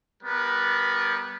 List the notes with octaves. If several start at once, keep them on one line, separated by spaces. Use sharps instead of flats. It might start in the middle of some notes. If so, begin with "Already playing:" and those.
G3 B3 A#4 B4